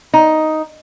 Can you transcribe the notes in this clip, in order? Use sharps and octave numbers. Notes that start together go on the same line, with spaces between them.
D#4